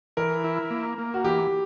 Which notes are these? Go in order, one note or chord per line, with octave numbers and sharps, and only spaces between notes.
E3 A#4
E4
A#3
A#3
F#4
E3 G4